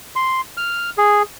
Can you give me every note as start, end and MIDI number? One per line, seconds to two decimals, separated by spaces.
0.16 0.41 84
0.57 0.90 89
0.98 1.22 68